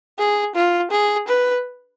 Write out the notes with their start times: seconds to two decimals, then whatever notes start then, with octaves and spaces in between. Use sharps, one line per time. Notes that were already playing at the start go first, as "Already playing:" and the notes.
0.18 G#4
0.55 F4
0.91 G#4
1.28 B4